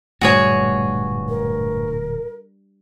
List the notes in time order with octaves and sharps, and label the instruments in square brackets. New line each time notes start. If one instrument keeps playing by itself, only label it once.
[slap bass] D1 A#2 A3 [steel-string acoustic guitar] G2 [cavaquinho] F#4 G#4 C#5
[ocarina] A#4